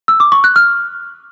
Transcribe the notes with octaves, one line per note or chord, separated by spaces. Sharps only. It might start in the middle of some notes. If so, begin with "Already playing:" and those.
E6
D6
C#6
F#6
F6